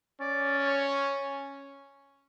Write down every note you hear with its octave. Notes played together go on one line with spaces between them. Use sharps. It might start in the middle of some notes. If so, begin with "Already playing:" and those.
C#4 D5
D5
C#5